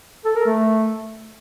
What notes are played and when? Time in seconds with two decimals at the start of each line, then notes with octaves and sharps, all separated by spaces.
0.25 A4
0.35 A#4
0.46 A3